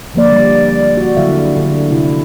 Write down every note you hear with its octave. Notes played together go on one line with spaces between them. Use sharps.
D3 F3 A#3 D5
G3
F#4
D3 F#3 E4 A4 E5 F5
D3
C3 E4